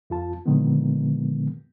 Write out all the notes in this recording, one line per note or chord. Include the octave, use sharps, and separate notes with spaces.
F2 F4 A5
A#2 D3 D#3 F3 G#3 B3